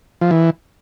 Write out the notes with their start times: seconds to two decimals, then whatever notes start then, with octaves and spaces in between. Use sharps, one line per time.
0.21 F3
0.31 E3